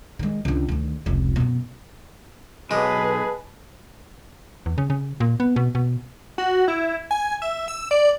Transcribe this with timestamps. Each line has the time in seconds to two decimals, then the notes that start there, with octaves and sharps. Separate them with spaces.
0.19 D#3 G#3
0.45 C#2 D3
0.69 D2 D#3
1.06 F1 C#2
1.36 F#2 B2
2.71 B1 G#3 G#4 B4 A5
4.66 E2
4.78 C#3
4.90 C#3
5.20 A#2
5.40 B3
5.56 B2
5.75 B2
6.38 F#4
6.68 E4
7.11 G#5
7.42 E5
7.68 E6
7.91 D5